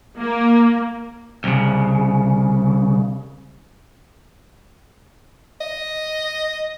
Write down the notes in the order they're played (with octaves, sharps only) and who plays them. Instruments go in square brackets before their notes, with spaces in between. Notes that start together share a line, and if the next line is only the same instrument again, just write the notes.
[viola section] A#3
[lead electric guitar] C2 C#3
[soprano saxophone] D#5